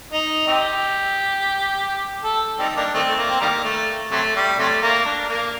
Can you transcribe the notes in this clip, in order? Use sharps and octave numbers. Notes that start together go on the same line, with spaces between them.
D#4
C4 D#4 G4
A4
G3 C4 D#4
G3 A#3 D4
D#3 A3 C4
A3
A#3
C4
D#3 G3 A#3
A3
C3 F#3 A3
G3
C3 F#3 A3
A#3
D4
A#3